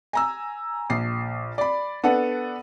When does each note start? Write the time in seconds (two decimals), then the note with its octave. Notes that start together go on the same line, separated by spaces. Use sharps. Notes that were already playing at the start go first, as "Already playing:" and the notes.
0.13 G#5 A#5 E6
0.90 A#1 C7
1.58 D5 B5
2.04 B3 D4 A4 F#5